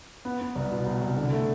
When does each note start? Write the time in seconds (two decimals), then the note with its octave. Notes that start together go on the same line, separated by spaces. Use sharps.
0.25 B3
0.41 B3
0.55 C2
0.72 B2
0.86 C2
1.01 C2
1.17 D3
1.32 A3